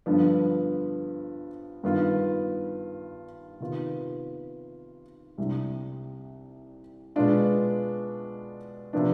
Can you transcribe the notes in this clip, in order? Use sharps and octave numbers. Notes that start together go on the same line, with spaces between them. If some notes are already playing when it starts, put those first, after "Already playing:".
G2 D3 F3 B3
G2 D#3 B3 F4
C3 D#3 B3 F4
C2 C3 G3 D4
B2 G#3 B3 D4 F4
C3 F3 B3 D4